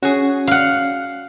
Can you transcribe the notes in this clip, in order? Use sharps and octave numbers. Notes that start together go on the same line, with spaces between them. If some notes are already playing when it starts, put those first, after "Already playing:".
C#4 F#4 G#4
F5 F#5